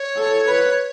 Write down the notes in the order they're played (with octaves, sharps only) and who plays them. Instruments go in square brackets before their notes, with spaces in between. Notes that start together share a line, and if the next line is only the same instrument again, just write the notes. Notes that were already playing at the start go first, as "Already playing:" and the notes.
Already playing: [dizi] C#5
[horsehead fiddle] A4
B4